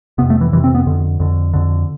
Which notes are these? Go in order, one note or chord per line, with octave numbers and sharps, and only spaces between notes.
F2 C3 B3
A3
E3
F2 C3 E3
C4
B3
F2 D3
F2 D3
F2 D3